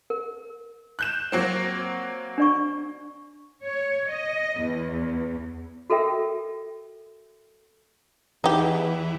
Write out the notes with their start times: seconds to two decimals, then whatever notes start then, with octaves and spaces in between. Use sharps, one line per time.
0.10 A#4
0.99 F#6 G6 E7
1.32 F#3 A#3 C4
2.38 D4 D5 C#6
3.64 C#5
4.10 D#5
4.62 E2
5.90 F#4 A4 A#4 E5 G5
8.44 E2 E3 D#4 G4